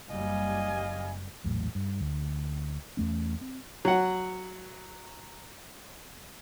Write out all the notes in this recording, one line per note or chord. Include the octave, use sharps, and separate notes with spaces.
F#1 G3 D#5 F5 G#5
A#1 E2 A2 F#3
G2
D2
E2 A3 C#4
C4
F#3 F#5